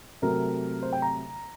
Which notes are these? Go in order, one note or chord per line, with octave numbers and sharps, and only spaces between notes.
C3 F#3 A3 A#4
C5
G5
A#5